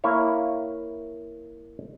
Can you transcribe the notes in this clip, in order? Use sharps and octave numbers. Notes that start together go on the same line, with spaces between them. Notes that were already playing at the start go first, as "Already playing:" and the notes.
A#3 E4 C#5